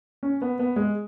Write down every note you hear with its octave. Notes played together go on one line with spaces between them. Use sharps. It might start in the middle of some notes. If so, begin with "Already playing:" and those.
C#4
B3
B3
G#3